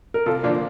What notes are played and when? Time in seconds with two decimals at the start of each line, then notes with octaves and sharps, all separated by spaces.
0.14 A#4
0.26 C2 F4 A4
0.43 A#2 F3 A#3 D4 F4